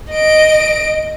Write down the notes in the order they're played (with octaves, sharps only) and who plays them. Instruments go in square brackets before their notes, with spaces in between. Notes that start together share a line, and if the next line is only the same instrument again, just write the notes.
[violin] D#5 D7